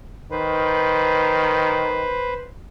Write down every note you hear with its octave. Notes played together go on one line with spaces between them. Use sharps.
D#3 B4 C5